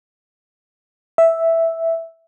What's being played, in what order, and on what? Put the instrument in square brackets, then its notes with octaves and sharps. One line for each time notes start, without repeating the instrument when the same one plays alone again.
[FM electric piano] E5